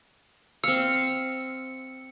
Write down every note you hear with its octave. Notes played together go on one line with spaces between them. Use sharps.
C4 F5 E6 C#7